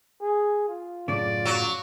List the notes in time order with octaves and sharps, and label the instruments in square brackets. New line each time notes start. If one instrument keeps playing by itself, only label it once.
[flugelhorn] G#4
F4
[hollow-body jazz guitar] F#2 A2 C#3 [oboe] D5
[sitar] F#3